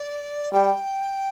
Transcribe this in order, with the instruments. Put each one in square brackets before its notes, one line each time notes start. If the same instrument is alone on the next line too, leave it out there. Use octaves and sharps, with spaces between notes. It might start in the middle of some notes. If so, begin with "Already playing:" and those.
Already playing: [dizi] D5
[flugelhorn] G3 [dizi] G5